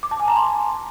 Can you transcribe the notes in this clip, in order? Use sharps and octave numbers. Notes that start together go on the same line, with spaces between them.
D6
A5
G#5
A#5
C6